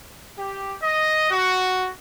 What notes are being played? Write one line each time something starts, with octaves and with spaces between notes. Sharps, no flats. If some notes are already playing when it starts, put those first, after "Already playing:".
G4
D#5
F#4